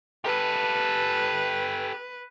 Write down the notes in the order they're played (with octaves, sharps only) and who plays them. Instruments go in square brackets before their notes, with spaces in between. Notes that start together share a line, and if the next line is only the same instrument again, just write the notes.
[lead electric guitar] G4 A4 [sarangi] B4